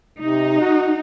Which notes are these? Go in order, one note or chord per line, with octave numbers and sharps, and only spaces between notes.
C3 D#4
F#4